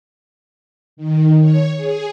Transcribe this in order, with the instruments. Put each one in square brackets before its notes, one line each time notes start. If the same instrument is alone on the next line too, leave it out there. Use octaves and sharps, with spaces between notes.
[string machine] D#3
C#5
G#4